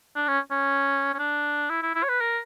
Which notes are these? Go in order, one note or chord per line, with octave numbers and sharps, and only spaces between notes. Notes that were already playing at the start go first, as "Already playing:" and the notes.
D4
C#4
C#4
C#4
D4
E4
E4
E4
C#5
B4
A#4